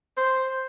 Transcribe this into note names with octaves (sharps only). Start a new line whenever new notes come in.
C5